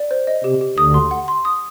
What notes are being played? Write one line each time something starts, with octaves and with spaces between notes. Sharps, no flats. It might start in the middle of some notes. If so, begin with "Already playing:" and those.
Already playing: D5
C5
D#5
C3 G4
G4
D2 D3 D#6
C6
F#5
C6
D#6